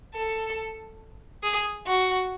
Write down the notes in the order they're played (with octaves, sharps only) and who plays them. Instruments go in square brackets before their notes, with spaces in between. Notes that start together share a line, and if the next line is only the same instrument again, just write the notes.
[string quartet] A4
G#4
F#4